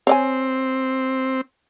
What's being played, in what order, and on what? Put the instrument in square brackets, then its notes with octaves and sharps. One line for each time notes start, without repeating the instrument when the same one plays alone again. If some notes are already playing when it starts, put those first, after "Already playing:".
[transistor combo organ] C4 [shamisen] C#5 D5 G#5